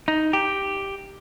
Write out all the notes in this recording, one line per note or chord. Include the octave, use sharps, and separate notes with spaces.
D#4
G4